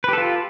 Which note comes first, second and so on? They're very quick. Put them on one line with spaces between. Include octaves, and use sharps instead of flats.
B4 G4 A4 F4